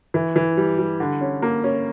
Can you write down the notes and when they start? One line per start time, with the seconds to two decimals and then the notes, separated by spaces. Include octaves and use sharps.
0.14 E3
0.36 E3
0.57 G3
0.79 G3
1.00 D3
1.21 C#4
1.42 A#3
1.64 C#4